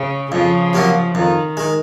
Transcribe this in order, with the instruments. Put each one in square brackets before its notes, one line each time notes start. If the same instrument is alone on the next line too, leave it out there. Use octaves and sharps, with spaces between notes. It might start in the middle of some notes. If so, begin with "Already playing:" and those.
Already playing: [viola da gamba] C#3
[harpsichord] F2 [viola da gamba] C#3 F3
[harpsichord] C3 F#3 A#3 F4
[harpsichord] F2 [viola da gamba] D#3
[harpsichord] D#3 G#3